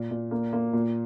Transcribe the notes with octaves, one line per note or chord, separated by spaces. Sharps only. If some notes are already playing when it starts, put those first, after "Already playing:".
Already playing: A#2
A#2
A#3
A#3
A#2